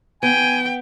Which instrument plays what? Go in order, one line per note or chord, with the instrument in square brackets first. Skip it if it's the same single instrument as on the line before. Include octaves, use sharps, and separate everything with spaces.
[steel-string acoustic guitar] B3 [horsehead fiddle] G5 [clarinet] G#5